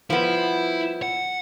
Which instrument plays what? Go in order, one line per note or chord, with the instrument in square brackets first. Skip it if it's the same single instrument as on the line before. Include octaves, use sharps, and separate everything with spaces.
[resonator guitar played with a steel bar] F3 G3 B3 [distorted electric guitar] E4
[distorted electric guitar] F#5